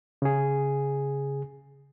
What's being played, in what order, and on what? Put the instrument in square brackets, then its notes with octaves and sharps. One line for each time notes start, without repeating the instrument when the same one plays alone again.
[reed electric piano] C#3 G#4